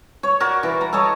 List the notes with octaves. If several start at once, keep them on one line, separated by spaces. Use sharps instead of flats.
C#5
F#4 A#4 D5
E3 B4
A#5
A4 C#5 D#5 A5